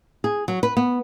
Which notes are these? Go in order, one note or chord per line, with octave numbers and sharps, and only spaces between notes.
G#4
F#3
B4
B3